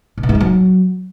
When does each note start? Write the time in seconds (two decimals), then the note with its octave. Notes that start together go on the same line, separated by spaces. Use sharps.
0.18 C3
0.23 B2
0.29 G#2
0.35 G3
0.41 F#3